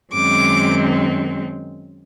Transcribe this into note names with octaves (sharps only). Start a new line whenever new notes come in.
F#2 D#3 G#3 C4 D6